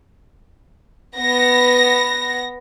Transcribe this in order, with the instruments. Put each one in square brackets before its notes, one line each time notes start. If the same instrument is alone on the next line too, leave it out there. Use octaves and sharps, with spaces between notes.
[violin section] B3 A#6